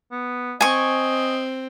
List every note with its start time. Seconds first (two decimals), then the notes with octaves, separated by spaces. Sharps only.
0.12 B3
0.61 C4 D#5 G#5 C#6